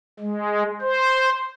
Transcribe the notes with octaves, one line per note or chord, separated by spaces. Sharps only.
G#3
C5